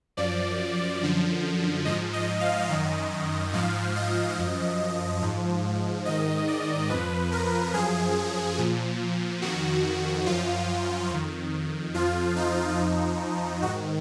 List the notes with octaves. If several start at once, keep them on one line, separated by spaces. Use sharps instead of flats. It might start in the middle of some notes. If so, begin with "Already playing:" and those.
F#2 F3 D5
F#2 D3 F3
G#2 F3 D#5
D#5
F5
F#2 D#3 D#5
G#2 F3 F5
D#5
F#2 F3
G#2 F3
G#2 D#3 D#5
D5
F2 F3 B4
A#4
F#2 F3 G#4
A#2 F3
F2 D#3 F#4
F#2 F3 F4
F2 D#3
F2 F3 F4
D#4
F2 F3 D#4
G#2 D#3 F#4